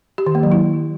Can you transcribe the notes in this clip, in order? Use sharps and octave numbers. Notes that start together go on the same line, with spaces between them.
G4
D#3
A#3
F#3
E4